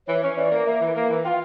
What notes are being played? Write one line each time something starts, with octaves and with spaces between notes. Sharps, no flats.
E3 C#5
C#4
E3 D5
A#3
A#3 E5
E3
A#3
E3
F4 F5 G5